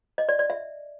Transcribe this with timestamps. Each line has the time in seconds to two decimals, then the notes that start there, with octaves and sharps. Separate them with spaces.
0.18 D#5
0.29 D5
0.39 D5
0.50 E5